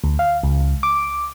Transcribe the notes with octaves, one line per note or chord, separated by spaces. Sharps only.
D2
F5
C#2
D6